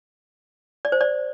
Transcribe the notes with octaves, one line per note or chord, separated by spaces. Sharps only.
D5
C5
D5